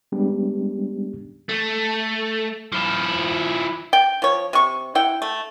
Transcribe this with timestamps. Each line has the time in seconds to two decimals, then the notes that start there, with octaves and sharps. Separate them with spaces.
0.12 G3 G#3 B3 C#4 D4 G4
1.49 A3
2.72 F3 E4
3.93 G5
4.22 F3 C#5
4.53 C3 C#6
4.95 E4 F#5 G5
5.22 A3